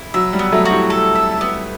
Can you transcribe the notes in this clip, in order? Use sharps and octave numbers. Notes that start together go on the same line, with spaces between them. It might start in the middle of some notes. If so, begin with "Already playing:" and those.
Already playing: E4
F#3 E5
G3
B3
F#3 A3
F#4
E4 G4
A4
E5
B3